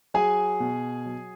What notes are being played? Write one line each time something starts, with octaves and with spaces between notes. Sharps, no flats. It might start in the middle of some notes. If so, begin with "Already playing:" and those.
F#3 G#4 G#5
B2
F#3